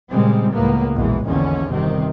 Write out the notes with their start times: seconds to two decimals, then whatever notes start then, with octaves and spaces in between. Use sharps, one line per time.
0.11 A#2 C#3 G3 G#3 C4
0.53 C#2 A2 A#3 B3
0.96 A#1 E2 B2 E3 G#3
1.26 A#1 E2 A#2 D3 D#3 C#4
1.71 G1 C3 D#3 C4